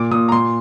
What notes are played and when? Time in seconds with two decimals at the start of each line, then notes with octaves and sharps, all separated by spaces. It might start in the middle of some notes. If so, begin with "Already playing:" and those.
Already playing: A#2 D6
0.11 A#2 D#6
0.29 A#5
0.32 A#2 C6